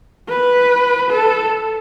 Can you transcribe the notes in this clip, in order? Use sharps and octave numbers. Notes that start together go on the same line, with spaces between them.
B4
A4